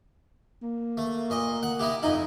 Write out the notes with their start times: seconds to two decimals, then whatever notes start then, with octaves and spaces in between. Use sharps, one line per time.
0.62 A#3
0.97 A3
1.30 A#2 D#5
1.63 F#5
1.79 D#4 E4 G4
2.03 F2 D#4 E4